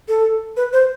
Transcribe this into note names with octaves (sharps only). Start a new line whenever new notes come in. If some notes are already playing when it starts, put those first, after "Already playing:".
A4
B4
C5